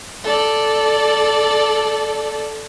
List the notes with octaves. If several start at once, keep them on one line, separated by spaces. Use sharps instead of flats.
A4 D5